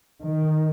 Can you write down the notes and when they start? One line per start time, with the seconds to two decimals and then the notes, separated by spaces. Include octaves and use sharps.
0.22 D#3